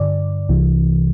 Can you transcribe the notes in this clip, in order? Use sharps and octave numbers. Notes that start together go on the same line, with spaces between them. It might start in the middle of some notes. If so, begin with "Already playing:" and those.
Already playing: G2 D3 D5
C2 C3 E3